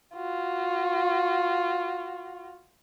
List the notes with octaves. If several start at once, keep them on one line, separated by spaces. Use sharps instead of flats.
F4 F#4